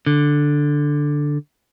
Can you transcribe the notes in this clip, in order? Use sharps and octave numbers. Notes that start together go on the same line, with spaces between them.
D3